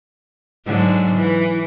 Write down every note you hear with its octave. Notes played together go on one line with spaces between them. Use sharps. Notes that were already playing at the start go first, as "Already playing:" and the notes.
G#2 D3 F#3
E3